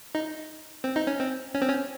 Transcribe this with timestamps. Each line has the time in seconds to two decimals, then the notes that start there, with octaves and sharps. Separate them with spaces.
0.15 D#4
0.84 C4
0.96 D#4
1.07 C#4
1.20 C4
1.54 C#4
1.62 C4
1.69 C#4